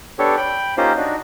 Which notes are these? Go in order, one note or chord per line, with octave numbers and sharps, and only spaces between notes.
B3 D4 G4 A4 C#5
G5 B5
A#3 C#4 D#4 F4 G4 C5
D4 D#4 F#4